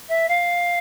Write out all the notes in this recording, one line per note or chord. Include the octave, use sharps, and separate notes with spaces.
E5
F5